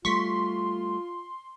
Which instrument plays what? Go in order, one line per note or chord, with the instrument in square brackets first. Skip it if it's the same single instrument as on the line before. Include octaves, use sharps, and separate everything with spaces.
[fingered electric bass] G3 A3 [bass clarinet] F4 [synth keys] C6 [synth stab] C#6 B6